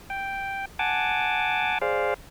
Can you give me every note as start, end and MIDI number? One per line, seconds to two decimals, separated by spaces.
0.10 0.65 79
0.79 1.78 78
0.79 1.78 80
0.79 1.78 81
0.79 1.78 86
1.82 2.14 68
1.82 2.14 72
1.82 2.14 74
1.82 2.14 77